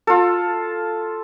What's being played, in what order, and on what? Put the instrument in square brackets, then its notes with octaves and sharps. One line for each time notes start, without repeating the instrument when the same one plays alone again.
[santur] F4 A4